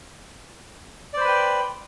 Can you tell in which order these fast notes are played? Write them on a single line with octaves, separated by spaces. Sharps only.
D5 C5 B5 B4 G5